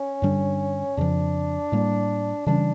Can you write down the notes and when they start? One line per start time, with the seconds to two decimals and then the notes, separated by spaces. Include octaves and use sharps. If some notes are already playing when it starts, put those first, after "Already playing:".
Already playing: C#4
0.22 G2 D3 G3 D4
0.97 F2 C#3 F3 D4
1.72 A2 G3 A#3
2.46 C#3 E3 G3 C#4 D4